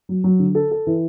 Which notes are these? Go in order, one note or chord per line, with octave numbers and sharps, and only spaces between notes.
F#3
F#3
D3
A4
A4
E3